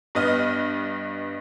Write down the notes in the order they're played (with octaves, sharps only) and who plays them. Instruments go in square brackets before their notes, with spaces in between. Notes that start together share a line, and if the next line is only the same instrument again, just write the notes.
[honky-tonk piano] G2 B3 D#5 F6